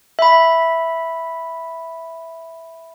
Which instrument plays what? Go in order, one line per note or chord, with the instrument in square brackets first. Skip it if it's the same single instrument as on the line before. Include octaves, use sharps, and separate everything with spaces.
[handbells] E5 B5